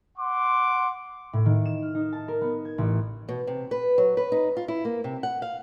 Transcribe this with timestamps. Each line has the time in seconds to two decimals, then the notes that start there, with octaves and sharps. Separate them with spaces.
0.17 F#5 C6 D6
1.33 A2
1.45 D#3
1.65 E7
1.82 F6
1.95 D#4
2.13 A5
2.28 A#4
2.41 B3
2.65 G#6
2.78 A1
3.29 B2
3.47 C3
3.71 B4
3.98 F#3
4.17 B4
4.32 D#4
4.57 F4
4.68 E4
4.85 A#3
5.04 C3
5.23 F#5
5.42 F5